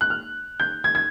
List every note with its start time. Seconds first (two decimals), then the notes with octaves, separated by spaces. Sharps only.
0.01 F#6
0.10 F6
0.60 G6
0.84 G#6
0.95 G#6